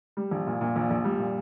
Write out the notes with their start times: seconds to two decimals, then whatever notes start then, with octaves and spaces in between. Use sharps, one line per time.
0.17 G3
0.31 A#1
0.47 A#2
0.61 A#2
0.76 A#1
0.90 A#1
1.05 G3
1.19 A#2